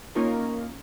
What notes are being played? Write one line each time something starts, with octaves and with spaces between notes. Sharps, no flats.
A#3 C#4 D#4 F4 A#4 C#5